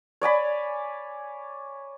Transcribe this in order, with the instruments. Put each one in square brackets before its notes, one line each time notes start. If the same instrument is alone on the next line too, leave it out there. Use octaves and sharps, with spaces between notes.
[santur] C#5 D5 G#5 B5